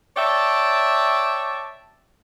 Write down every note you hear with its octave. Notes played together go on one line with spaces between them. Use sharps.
C#5 D5 E5 G5 A5